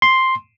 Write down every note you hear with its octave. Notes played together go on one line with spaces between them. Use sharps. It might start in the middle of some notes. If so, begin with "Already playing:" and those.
C6